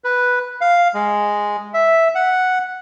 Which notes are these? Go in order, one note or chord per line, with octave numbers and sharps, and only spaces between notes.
B4
F5
G#3
E5
F#5